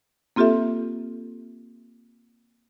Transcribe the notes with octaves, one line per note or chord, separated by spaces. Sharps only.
A#3 C4 F4 G4 A4 E5